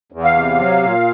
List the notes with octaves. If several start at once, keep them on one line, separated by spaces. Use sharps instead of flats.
E2
F5
C3
F#3
A#2